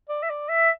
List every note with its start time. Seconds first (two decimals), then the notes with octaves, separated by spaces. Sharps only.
0.09 D5
0.23 E5
0.30 D5
0.49 E5